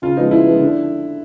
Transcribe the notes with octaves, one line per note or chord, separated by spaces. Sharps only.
C#3 F4
F3 G#3 B3 D#4
C#3 E4
F3 G#3 B3
D3